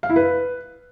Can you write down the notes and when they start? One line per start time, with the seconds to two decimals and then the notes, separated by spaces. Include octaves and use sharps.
0.03 F5
0.10 E4
0.16 B4